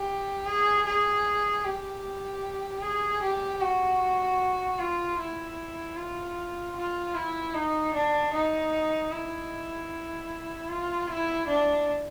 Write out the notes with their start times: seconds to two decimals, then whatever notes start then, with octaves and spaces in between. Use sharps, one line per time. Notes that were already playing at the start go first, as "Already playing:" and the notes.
Already playing: G4
0.47 G#4
0.86 G#4
1.64 G4
2.82 G#4
3.22 G4
3.61 F#4
4.79 F4
5.18 E4
5.97 F4
6.76 F4
7.15 E4
7.54 D#4
7.94 D4
8.33 D#4
9.12 E4
10.69 F4
11.08 E4
11.47 D4